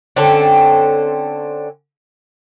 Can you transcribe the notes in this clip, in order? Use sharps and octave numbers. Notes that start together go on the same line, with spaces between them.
D3 C4 C#4 A4